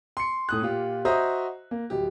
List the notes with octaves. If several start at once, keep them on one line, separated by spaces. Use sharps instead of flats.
C6 C#7
A2 D#6 F#6
A#2 F4 G4
F#4 C5 D#5 E5 A#5 D#6
A#3
D1 G4